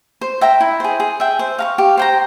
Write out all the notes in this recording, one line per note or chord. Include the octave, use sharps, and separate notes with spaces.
C5
E5 G5 A#5
E4
G#4 C5
G#4
E5 G5
C5
F5 A#5 C#6
G4
C5 G5 A#5